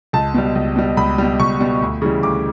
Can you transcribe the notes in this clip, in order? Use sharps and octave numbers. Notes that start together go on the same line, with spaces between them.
C#2 A5
B2 G3
C#2
B2 G3
C#2 B5
B2 G3
C#2 C#6
B2 G3
D2
C#3 E3 G3
D2 D6